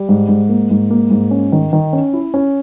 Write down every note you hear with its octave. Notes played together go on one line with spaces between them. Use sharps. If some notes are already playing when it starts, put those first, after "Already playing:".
Already playing: G3
G#2
G#2
A#3
G#2
A#3
G#2
C#4
D#3
D#3
C#4
E4
C#4